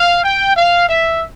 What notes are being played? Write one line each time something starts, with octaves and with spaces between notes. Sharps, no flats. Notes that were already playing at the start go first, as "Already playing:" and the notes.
Already playing: F5
G5
F5
E5